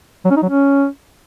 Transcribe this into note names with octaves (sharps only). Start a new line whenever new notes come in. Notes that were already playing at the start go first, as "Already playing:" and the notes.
F#3
C#4
D#4
F#3
C#4